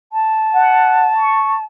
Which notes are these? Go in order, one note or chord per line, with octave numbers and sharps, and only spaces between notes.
A5
F#5
C#6